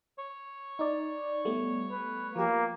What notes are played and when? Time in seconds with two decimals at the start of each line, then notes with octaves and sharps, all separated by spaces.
0.18 C#5
0.79 D#4 D5
1.45 G3 A3 B3
1.91 B4
2.36 F3 A#3 G4